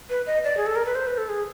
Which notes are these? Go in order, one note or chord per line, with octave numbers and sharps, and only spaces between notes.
B4
D#5
D5
G#4
A4
A#4
B4
C5
B4
A4
G#4